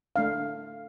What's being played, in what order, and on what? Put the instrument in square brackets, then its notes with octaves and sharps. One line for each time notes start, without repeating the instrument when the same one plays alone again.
[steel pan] A3 D4 F5